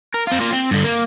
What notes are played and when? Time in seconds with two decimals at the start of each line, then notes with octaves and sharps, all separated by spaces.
0.14 A#4
0.27 C4 F4
0.40 A#3 F4
0.52 C4
0.71 G2 D3
0.84 A#3